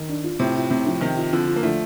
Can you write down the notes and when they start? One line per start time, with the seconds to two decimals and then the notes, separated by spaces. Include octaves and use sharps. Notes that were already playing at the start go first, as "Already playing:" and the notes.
Already playing: D#3
0.09 D4
0.24 F4
0.39 A2 C3 F4
0.56 F4
0.70 A2 C3 C4
0.87 F3
1.01 C3 D#3 F3
1.17 F4
1.33 D3 F3 C4
1.47 F4
1.56 A#3
1.63 D3 F3 A3